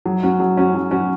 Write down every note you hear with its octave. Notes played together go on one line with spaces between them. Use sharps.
F#3
C#4 F#4
F#3
C#4 F#4
F#3
C#4 F#4